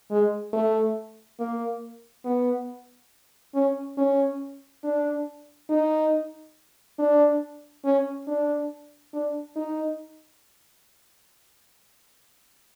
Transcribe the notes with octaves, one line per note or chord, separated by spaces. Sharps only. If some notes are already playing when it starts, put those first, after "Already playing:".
G#3
A3
A#3
B3
C#4
C#4
D4
D#4
D4
C#4
D4
D4
D#4